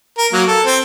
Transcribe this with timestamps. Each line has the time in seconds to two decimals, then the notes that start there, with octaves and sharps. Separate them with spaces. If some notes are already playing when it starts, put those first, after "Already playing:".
0.18 A#4
0.33 F#3 A#3
0.47 A4
0.66 C4